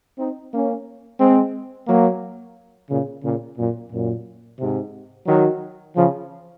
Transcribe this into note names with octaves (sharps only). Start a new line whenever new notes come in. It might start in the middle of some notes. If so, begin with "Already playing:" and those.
C4 D#4
A#3 C#4
G#3 C4
F#3 A#3
A#2 C#3
A#2 C#3
F#2 A#2
F#2 A#2
G#2 C3
D#3 F#3
C#3 F3